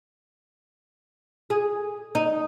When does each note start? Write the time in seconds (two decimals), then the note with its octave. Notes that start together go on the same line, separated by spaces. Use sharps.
1.50 G#4
2.15 D#4